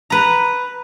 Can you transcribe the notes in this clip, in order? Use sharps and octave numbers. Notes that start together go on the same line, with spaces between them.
B4 A#5